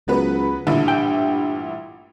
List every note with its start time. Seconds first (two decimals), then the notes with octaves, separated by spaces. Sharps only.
0.08 C#2 F#3 B3 B4
0.67 A1 G2 A#2 D3 E4
0.88 G5